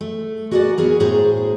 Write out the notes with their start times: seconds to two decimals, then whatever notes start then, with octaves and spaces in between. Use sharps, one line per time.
0.01 A3
0.51 F#4 G#4 A#4 C#5 D5 F#5
0.78 B3 F#4 G#4 A#4
1.00 A2 G#4 C5 A#5